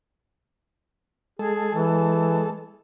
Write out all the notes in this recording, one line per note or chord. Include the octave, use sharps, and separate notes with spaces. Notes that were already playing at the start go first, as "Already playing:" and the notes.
G#3 G#4 A4
E3